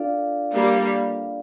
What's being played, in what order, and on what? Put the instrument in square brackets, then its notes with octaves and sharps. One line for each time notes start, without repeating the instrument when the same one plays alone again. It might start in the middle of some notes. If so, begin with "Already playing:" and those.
Already playing: [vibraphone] D4 F4 A4 D5 F5
[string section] G3 A#3